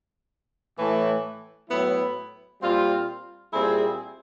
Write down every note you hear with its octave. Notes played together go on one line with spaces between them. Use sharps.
A2 E3 A3
A2 F#3 B3 E4
A#2 G3 C4 F4
A#2 G3 C4 E4 G#4